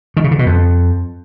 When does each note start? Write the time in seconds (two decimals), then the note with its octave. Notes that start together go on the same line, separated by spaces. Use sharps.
0.17 D#3
0.24 C#3
0.31 D3
0.39 B2
0.46 F2